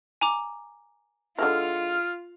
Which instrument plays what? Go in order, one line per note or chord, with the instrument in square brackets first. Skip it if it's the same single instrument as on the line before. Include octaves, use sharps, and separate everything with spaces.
[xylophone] G#5 A#5 D6
[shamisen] D3 G#3 E4 [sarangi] F4 [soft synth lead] F6